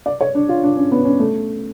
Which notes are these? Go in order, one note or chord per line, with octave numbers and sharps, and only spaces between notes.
D5
C#5
D4
F4
D4
C#4
B3
C#4
A3